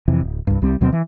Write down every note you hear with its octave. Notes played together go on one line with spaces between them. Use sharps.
F2 C3 E3
D1
C2 G2
C2 G3 C4
D2 B2 F#3 C4
E3